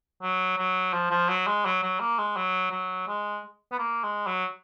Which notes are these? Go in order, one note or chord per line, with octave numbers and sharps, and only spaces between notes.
F#3
F#3
F3
F3
F#3
G#3
F#3
F#3
A#3
G#3
F#3
F#3
G#3
B3
A#3
G#3
F#3